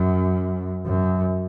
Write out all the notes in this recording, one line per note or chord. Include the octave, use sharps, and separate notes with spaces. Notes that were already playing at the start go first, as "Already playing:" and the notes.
Already playing: F#2
F#2